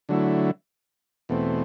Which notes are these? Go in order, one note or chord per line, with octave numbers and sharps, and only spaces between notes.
D3 F#3 A3 E4
E2 B2 A3 C4